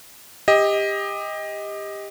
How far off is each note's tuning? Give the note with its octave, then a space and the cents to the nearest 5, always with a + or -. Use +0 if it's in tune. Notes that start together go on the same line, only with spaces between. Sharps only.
G4 +25 D#5 +15